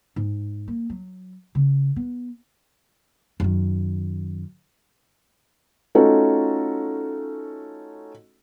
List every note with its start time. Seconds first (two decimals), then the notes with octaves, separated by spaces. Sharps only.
0.16 G#2
0.68 A#3
0.90 F#3
1.55 C#3
1.96 B3
3.40 F#2 D#3
5.95 A3 C#4 D#4 F4 F#4 A4